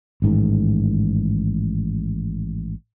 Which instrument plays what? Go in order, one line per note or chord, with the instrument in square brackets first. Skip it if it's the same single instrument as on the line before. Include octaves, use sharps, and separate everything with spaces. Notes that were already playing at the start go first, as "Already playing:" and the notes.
[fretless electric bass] A1 G#2 D#3